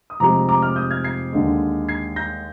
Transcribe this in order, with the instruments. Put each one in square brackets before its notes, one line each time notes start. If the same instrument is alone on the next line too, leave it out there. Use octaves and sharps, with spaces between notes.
[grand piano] D#6
F1 F2 C3 F3 G#3 A#5 D6
A#5 D6
D6 F6
D#6 G6
F6 G#6
G#6 C7
D#2 D3 G#3
G#6 C7
G6 A#6